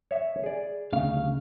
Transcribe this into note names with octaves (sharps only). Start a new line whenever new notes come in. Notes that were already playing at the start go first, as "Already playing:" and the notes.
C#5 E5
G#4 D5
D2 C#3 F5